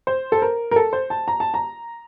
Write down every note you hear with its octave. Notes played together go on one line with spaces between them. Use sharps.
C5
A4
A#4
A#4
A4
C5
A5
A#5
A5
A#5